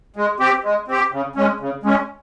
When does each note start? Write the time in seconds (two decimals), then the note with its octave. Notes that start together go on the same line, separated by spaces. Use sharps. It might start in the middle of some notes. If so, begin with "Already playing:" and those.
0.16 G#3
0.40 C4 G4
0.64 G#3
0.88 C4 G4
1.12 C#3
1.36 G#3 C#4
1.60 C#3
1.83 G#3 C#4